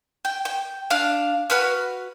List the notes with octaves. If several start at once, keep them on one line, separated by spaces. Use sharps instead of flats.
G5
G5
D4 F5
F#4 B4 F6